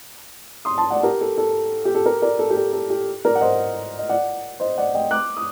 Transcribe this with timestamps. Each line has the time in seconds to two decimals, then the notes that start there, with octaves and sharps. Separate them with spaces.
0.65 C6 D#6
0.78 A5 C6
0.90 D5 F#5
1.03 G4 A#4
1.21 A4
1.38 A4
1.85 G4
1.95 A4
2.06 G4 A#4
2.22 A#4 D5
2.39 A4
2.50 G4
2.57 A4
2.73 A4
2.90 G4
3.25 A#4 D5
3.35 F#5
3.41 C5 D#5
3.99 D#5
4.09 D5 F#5
4.60 C5 D#5
4.78 D5 F#5
4.94 D#5 G5
5.11 D6 F#6
5.37 D#6